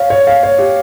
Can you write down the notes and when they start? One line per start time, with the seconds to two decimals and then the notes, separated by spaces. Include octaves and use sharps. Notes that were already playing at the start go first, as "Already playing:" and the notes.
Already playing: C#5 F5
0.10 C#5
0.27 F5
0.43 C#5
0.58 G4